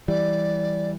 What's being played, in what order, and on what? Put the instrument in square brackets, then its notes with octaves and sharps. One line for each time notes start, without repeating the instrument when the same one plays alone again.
[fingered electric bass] E3 G3 [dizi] D5